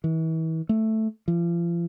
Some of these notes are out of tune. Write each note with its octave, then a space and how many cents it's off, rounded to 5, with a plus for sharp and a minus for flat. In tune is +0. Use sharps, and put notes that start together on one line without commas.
E3 -35
A3 +0
F3 -40